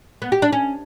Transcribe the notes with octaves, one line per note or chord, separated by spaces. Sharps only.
B3
G4
D4
C#4